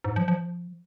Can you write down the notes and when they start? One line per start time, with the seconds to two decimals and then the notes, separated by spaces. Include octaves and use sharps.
0.04 G#2
0.16 F3
0.28 F3